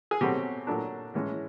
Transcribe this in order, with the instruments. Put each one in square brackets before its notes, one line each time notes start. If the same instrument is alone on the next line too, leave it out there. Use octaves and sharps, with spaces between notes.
[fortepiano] G#4
B2 F#3 A3 C4 G4
A#2 F#3 A3 D4
A2 E3 G#3 C#4